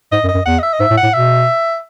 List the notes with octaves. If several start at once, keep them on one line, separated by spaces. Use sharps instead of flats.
G#2 D#5
F#2
D#5
F#2
E2 F#5
D#5
E5
D#5
G#2 E5
A2
F#5
A2
B2 E5